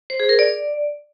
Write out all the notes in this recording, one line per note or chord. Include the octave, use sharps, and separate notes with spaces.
C5
G#4
A#4
D5